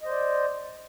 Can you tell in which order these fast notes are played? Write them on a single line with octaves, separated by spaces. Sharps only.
D#5 C5 D5